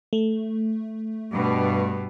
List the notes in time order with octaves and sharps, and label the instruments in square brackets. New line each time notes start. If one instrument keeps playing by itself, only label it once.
[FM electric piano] A3
[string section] G2 B2